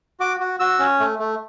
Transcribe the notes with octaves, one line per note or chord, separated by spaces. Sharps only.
F#4 D6
F#4
F#4 E6
C#4
A3
A3